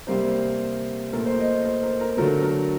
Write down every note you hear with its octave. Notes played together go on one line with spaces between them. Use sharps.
C3 G3 A#3 C5
A#2 A3 A#4
C5
D#5
C5
A#4
A#4
D3 F#3 A3 A#4
A#4